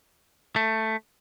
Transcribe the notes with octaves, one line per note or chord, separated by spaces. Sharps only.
A3